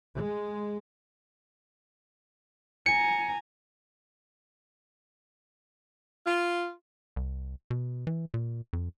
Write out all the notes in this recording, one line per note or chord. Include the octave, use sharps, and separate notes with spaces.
G#3
G#5 A#5 C#7
F4
C2
B2
E3
A#2
F2